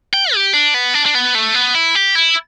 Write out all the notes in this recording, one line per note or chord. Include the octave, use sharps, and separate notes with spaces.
G5
G4
D4
B3
D4
D4
B3
A3
B3
E4
G4
E4